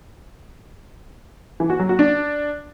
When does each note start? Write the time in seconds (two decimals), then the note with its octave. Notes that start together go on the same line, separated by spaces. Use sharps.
1.60 E3
1.70 F#4
1.79 F#3
1.89 F#4
1.99 D4